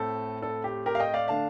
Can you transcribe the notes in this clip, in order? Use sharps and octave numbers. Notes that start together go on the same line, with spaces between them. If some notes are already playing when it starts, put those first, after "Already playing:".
Already playing: A2 A3 C4 A4
A4
G4
G4 A#4
F5
D#5 G5
D5 F5
D3 A3 D4 F5 A5